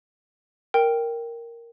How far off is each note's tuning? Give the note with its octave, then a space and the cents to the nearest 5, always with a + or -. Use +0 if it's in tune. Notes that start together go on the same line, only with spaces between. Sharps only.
A#4 +0 G5 +0